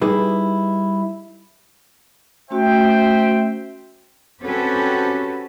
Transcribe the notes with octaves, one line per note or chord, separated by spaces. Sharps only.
G3 D#4 E4 G#4 B4
A3 C#4 F#4 C5 E5 G5
C4 C#4 F#4 G4 A4 B4